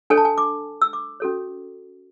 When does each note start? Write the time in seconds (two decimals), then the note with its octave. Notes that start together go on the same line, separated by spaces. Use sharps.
0.10 D4 A4 C#5 G#5
0.17 A5
0.25 G#5
0.38 D6
0.82 E6
0.93 D6
1.20 C#4 F#4 A4 C#5